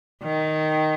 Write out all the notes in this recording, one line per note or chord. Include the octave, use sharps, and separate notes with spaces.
D#3